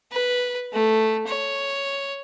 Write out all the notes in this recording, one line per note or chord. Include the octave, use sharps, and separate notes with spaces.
B4
A3
C#5